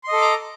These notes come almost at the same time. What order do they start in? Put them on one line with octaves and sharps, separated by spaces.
C6 D#5 A4 D6 A#5